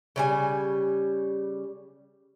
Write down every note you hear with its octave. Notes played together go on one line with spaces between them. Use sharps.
C#3 G3 G#5